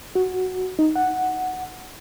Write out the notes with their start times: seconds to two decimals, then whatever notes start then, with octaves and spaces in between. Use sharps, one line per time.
0.15 F#4
0.79 D#4
0.96 F#5